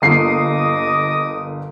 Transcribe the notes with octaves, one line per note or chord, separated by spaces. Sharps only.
G1 A#3 D#5 D6 D#6 C7